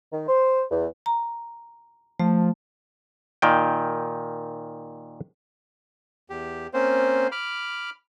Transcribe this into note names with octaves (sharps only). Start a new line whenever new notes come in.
D#3
C5
E2
A#5
F3 A3
A#2 D#3 G5
E2 G4
A#3 C4 C#4 C5
B5 D6 F6